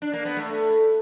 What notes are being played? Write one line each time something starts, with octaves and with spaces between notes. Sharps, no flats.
D4
A#3
B3
A3